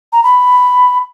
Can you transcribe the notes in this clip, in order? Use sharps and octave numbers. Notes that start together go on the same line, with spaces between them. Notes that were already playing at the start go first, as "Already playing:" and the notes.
A#5
B5